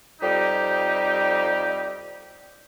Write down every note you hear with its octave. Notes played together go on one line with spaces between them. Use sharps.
F2 G3 D#4 G4